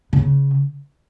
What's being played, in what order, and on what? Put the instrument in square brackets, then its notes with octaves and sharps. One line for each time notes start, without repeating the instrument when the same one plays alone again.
[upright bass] C#3